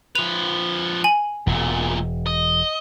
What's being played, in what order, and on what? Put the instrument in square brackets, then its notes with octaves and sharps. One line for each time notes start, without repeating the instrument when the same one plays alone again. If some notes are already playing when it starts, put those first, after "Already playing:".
[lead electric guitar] F3 B4 [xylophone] F7
[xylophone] G#5 F#7
[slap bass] E1 [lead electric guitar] E2 A#2
[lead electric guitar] D#5